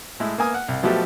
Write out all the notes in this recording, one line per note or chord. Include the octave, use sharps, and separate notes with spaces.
A2 G#3 E4
A#3 B3 G#5 D#6
F#5
C2
B2 F3 F#3 A3 G4 A4